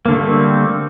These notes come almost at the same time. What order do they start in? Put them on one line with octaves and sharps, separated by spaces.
A#3 D3 A3 G3 C4